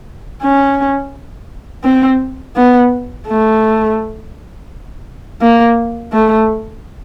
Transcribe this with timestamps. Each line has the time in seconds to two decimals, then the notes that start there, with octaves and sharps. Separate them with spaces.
0.43 C#4
1.84 C4
2.56 B3
3.27 A3
5.42 A#3
6.13 A3